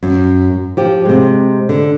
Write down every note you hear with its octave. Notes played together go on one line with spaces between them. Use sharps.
F#2
F3 G4
C3 G#3
D3